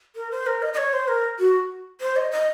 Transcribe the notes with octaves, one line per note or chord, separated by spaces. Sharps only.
A#4
C5
A#4
D#5
D#5
C#5
C5
A#4
F#4
C5
D#5
D#5